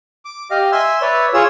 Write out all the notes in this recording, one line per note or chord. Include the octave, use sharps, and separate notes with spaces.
D6
G4 D#5 F5
E5 G#5 C6 E6
B4 C#5 D5 E5
F4 G#4 C#5 E6